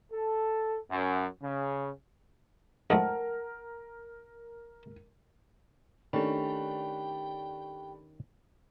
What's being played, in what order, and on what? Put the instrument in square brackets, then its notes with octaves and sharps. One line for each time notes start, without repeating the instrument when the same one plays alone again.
[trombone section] A4
F#2
C#3
[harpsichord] F3 A3 D#4 [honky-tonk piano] A#4 [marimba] F#5 A5
[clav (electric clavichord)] D#3 C#4 [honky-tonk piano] A3 D4 [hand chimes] G4 B5 [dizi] G5